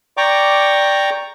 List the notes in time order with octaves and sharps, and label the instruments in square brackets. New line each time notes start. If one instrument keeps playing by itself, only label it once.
[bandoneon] D5 G5 A#5 C#6 D6